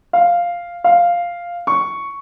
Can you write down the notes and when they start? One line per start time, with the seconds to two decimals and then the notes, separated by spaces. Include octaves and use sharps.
0.13 F5
0.84 F5
1.67 C#6